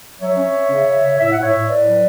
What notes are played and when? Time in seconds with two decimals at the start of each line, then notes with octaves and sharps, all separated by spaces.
0.20 F#3 C#5 E5
0.37 C#4
0.53 C#4
0.70 C#3
0.86 C#3
1.03 C#3
1.19 A2 E5
1.31 A2 F#5
1.43 C#5 E5
1.51 A2
1.68 A2 B4 D5
1.85 F#3